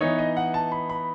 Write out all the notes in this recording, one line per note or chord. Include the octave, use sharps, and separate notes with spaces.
E3 B3 D#4 C#5
D#5
F#5
A5
B5
B5